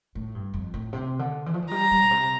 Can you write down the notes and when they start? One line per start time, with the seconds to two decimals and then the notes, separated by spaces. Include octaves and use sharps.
0.15 A2
0.35 G2
0.54 F2
0.74 A2
0.93 C3
1.19 D3
1.46 E3
1.54 F3
1.62 E3
1.71 G3 A#5
1.91 G3
2.03 A#2
2.11 C3